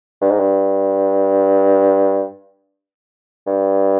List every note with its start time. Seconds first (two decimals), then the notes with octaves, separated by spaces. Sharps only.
0.21 G2
0.31 G#2
0.40 G2
3.47 G2